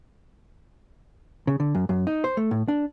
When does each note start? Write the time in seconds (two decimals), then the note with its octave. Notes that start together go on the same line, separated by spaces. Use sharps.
1.47 C#3
1.60 D3
1.75 F#2
1.89 F#2
2.07 D#4
2.24 C5
2.37 A3
2.51 A2
2.68 D4